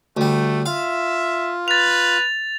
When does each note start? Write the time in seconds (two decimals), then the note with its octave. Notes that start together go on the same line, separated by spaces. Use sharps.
0.17 D2 G3 A3
0.66 F4 E5 F5
1.68 B4 A6 F7